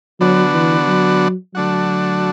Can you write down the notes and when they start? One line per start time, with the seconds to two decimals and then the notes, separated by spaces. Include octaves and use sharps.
0.20 D3 F#3 B3 D4 F#4
0.54 E3
0.87 F#3
1.54 D3 F#3 A3 D4 F#4